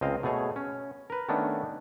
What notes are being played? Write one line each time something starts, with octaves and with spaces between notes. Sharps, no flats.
C#2 C4 D#5 F5
B2 A3 G#4 C#5
C#4
A#4 B4
D#3 A3 B3 C#4 D4